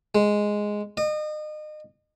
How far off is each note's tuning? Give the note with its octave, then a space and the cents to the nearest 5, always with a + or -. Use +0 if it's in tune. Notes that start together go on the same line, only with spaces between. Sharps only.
G#3 +0
D#5 -35